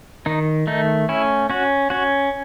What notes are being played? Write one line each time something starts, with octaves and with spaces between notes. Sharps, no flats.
D#3 D#4
A3 D#4
C#4 E4
C#4 F#4
C#4 F#4